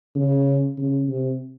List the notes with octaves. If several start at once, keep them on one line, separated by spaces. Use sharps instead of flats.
C#3
C#3
C3